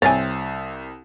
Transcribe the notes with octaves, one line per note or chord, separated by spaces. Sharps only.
C2 C4 C#5 G#5 A6